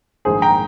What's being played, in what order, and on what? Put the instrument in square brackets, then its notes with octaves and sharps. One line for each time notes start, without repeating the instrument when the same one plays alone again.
[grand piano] A#1 G#2 D#3 G#4 C5
G5 A#5